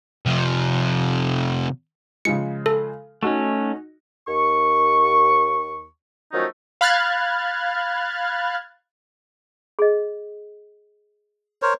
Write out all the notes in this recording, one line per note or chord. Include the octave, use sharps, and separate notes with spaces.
C3 F3
C#3 F3 G#3 C#7
A4
A3 C#4 D#4 F#4
D#2 C#6
D#3 F3 F#3 A3 C#4 D#4
F5 B5 F6 F#6 G#6 A6
G#4 D#5
A#4 C5 C#5